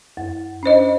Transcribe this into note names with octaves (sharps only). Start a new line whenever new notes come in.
F#2
C#4 D4 C5 D#5